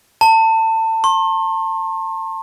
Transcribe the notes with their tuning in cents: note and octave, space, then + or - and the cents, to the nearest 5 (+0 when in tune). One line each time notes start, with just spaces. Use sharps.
A5 +30
C6 +40